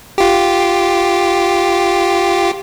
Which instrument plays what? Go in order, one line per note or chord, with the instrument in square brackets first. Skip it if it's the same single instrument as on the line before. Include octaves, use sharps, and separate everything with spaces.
[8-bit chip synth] F4 G4